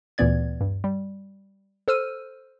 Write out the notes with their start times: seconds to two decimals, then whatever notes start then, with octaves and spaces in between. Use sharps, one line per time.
0.18 D2 A#2 E3 B3 D5 G#6
0.61 G2
0.84 G3
1.88 A4 C5 E6 F6 D#7